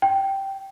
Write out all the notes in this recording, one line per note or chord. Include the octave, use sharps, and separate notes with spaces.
G5